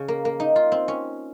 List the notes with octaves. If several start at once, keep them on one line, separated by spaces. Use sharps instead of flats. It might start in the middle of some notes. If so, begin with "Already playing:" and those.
Already playing: C#3
A#3
A#3
D#4
F4
C4
C#4